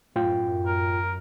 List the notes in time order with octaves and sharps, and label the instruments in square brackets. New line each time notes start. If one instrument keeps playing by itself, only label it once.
[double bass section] F#2 [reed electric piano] A2 F4 G5
[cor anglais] A#4